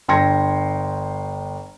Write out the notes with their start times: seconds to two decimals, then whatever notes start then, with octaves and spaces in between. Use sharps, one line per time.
0.08 G1 G5 C6 G#6 A#6 C#7